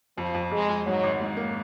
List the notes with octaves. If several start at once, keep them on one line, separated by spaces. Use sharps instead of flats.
F2 F3
F2
F2 G#3
F2
G#2 F#3
G#1
G#2
A#3